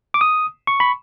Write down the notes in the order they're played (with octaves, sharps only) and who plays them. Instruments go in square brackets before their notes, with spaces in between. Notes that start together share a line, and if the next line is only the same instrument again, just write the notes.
[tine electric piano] D6
D#6
C#6
B5